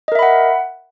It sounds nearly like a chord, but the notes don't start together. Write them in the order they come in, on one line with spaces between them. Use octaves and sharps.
D#5 A#4 E5 B5 F#5